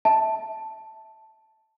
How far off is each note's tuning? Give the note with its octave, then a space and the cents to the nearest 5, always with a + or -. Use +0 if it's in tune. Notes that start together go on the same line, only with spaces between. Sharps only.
E5 -20 A5 +0